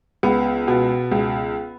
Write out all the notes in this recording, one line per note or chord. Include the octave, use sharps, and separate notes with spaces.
C#2 B3
B2 B3
C#2